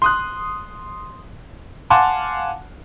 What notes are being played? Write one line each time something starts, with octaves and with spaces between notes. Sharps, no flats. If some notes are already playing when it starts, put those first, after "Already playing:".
C6 D#6 F#6
F5 F#5 G#5 A5 C6 D6